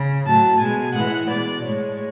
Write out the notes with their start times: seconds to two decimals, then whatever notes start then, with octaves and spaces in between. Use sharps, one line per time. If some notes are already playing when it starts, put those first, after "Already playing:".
Already playing: C#3
0.26 A2 F#3 A5
0.60 B2 G#3 G#5
0.96 A2 E3 G#3 F#5
1.30 B2 G#3 D5
1.64 A2 G#3 C#5